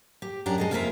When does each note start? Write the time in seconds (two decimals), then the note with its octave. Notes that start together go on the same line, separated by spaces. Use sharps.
0.22 G4
0.46 F#2 D4 G4 A#5
0.58 G#3 A4 D#5
0.71 F2 A#3 F4 F#4 A#4 E5